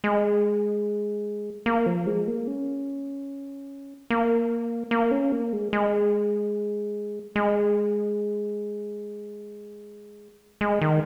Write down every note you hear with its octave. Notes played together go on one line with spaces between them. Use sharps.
G#3
A#3
F3
G#3
A#3
C#4
A#3
A#3
C#4
A#3
G#3
G#3
G#3
G#3
D#3